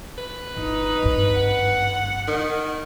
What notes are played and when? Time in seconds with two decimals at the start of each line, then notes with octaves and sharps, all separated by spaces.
0.18 B4
0.57 G1 D#4
1.02 G#1 G2
1.37 F#5
2.27 D#3